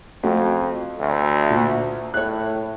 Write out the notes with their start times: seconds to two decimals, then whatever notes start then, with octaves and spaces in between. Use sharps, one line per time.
0.23 F2 A3 F#4
1.00 D2
1.50 A#2
2.14 A2 C#5 F#6